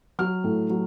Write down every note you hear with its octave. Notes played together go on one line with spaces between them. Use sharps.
F#3 F6
A2
F#3